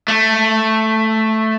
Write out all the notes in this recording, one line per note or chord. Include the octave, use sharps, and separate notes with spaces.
A3